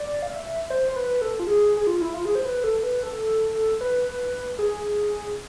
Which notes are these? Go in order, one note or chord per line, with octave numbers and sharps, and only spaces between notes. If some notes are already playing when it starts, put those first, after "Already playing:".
Already playing: D5
F5
E5
C5
C5
B4
A4
F4
G#4
G#4
F4
E4
F4
G#4
C5
B4
A4
B4
A4
B4
G#4